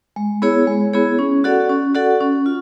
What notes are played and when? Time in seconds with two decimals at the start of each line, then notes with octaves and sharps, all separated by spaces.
0.16 G#3
0.42 B3 E4 G#4 C#5
0.67 G#3
0.93 B3 E4 G#4 C#5
1.19 C#4
1.44 F#4 A4 D5 F#5
1.69 C#4
1.95 F#4 A4 D5 F#5
2.21 C#4
2.46 F4